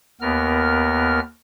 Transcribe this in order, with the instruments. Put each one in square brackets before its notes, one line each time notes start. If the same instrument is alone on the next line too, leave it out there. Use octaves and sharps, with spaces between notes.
[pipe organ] D#2 B3 A#4 F6